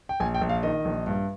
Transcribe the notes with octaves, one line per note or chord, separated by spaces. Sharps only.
G5
A#1 G#5
G5
A#1
F5
D#3 D#5
A#1
G2